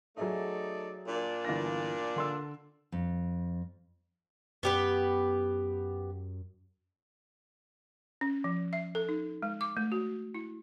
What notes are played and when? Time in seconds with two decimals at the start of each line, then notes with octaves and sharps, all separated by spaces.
0.17 F#3 A3 D#4 G#4 D5 E5
1.08 A#2 D4
1.45 G1 E3 A#6
2.16 D3 C6 E6
2.92 F2
4.63 F#2 B3 G4 B4
8.21 C#4
8.44 F3
8.73 E5
8.95 A4
9.09 D#4
9.42 G#3
9.61 D6
9.77 A3
9.92 F#4
10.34 E4